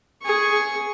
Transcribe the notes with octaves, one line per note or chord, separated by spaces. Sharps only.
G#4 C#6